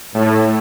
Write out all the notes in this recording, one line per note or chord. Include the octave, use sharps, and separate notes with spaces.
A2 A3